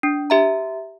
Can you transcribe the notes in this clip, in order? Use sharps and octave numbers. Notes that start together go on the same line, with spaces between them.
D4
G4 E5 A#5